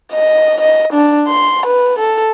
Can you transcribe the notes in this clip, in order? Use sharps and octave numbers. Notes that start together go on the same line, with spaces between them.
D#5
D#5
D4
C6
B4
A4